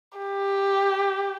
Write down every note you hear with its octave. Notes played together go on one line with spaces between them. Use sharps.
G4